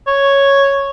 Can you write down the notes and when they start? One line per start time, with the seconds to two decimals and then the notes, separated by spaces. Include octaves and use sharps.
0.08 C#5